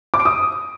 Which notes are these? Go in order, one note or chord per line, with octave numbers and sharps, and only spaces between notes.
D6
D7
D#6